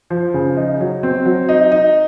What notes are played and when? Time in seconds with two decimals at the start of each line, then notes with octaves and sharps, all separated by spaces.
0.10 F3
0.34 C#3
0.57 D#4
0.80 F#3
1.03 C4
1.25 F#3
1.49 D#4
1.72 D#4